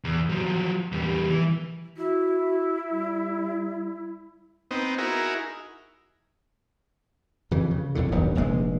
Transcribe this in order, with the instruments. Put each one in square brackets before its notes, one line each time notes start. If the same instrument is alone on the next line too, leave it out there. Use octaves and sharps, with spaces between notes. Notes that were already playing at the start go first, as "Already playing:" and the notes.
[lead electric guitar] E2
F3 F#3
E2 G3
E3
[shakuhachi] E4 [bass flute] F#4
[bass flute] G3
[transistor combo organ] B3 C4 D#4
D#4 E4 F#4 G#4 A#4
[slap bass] F2 C#3 E3
C#3
B1 F2 A2 D3
D#1 B1 G2 B3
F1 A#1 C3 G#3